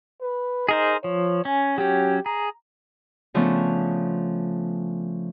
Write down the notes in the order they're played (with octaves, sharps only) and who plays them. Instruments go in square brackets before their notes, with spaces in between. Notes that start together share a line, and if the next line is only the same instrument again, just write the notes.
[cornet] B4
[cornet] D#4 [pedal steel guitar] G#4 A#4 C5
[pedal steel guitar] F3 [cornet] C#5
[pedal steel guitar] C#4 [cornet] G#5
[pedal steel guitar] F#3 C#4 [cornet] G4
[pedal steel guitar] G#4 [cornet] A#5
[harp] C#3 F3 A3 B3 C#4 D4